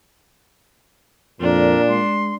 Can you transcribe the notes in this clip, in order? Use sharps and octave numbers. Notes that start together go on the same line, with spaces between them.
F2 A#2 D4 A#4
G#3 C6